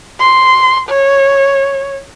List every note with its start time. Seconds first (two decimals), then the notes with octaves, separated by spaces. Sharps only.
0.20 C6
0.89 C#5